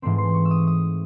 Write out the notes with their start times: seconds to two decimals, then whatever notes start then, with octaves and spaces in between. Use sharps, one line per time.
0.02 G#2 E3 A3 C4 C6
0.18 C6
0.34 C#6
0.45 E6
0.51 D#6
0.67 D#6